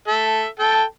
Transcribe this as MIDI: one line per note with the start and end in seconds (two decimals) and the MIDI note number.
0.08 0.47 69
0.08 0.47 76
0.59 0.83 69
0.59 0.83 79
0.59 0.83 81